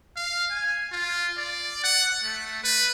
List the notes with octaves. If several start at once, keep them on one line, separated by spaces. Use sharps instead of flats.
F5
G#5
F4
D5
F#5
A3
B4